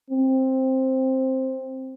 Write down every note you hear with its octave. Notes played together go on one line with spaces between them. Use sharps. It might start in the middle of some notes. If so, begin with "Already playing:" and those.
C4